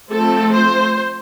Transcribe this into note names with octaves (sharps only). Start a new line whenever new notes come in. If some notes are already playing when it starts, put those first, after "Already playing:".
F3 A3 C4 A4
C5